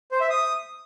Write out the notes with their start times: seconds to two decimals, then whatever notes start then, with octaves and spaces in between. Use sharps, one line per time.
0.12 C5
0.21 E5
0.30 D#6